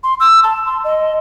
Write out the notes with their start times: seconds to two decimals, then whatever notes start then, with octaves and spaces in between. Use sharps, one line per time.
0.03 C6
0.20 E6
0.43 A5
0.66 C6
0.84 D#5